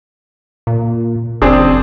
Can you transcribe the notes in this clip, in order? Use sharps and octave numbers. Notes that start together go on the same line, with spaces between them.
A#2
F#1 C4 D4 G#4